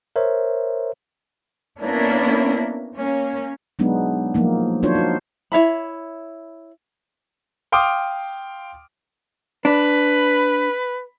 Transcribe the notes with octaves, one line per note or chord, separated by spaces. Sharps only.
A#4 C5 C#5 E5
A#3 B3 C#4 D4 E4 A#4
A#3 C#4
F#3 G#3 B3 D4 D#4
F3 F#3 A#3 D#4
D4 D#4 F4 F#4 C5 C#5
D#4 F#4
E4 C#5 E5 B5
F5 G5 C6 D6 D#6 F6
D4 B4 B5